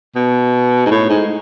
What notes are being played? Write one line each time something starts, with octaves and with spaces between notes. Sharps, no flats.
B2
G#2
A2
G#2